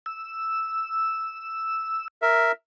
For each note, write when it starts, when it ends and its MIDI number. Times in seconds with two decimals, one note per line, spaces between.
0.06 2.08 88
2.22 2.52 70
2.22 2.52 76